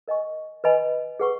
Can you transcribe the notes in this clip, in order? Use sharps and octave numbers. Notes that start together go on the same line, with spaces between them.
A#4 D#5 G#5 C#6
B4 D#5 G#5 B5
G#4 B4 F#5 C#6